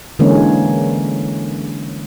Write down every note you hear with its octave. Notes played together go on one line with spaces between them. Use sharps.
D3 E3 G#3 A#3 C#4